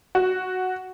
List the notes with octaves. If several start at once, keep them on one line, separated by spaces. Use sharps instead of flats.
F#4